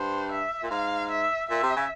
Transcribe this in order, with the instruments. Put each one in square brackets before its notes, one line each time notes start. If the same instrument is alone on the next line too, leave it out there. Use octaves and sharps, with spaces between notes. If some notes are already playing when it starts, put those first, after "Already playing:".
Already playing: [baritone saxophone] G2 [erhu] C5
[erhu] E5
[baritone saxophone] A#2
[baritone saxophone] G#2 [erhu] F5
[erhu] E5
[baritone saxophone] A#2 [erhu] E5
[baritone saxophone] C3
C#3